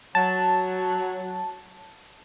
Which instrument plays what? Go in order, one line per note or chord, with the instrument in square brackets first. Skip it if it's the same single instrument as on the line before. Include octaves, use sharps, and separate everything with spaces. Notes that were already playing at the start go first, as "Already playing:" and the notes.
[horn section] F#3 [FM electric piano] A5